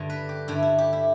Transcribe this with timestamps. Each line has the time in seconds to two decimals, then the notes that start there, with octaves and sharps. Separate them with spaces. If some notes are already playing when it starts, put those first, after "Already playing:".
Already playing: G2 D3 E4 A4
0.10 B4
0.29 G4
0.48 G2 D3 E4
0.63 E4
0.78 G4
0.93 E4